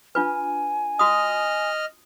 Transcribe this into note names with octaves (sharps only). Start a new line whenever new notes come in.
D4 F4 B4 G#5
F#4 D#5 D#6 F6